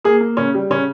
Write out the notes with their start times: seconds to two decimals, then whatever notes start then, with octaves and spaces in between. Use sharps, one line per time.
0.04 A#3 G#4
0.20 A#3
0.37 C#3 C#4
0.54 G3
0.70 C#3 C#4